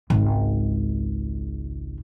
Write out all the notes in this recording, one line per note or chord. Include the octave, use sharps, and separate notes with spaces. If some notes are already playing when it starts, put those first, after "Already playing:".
G#1 C#2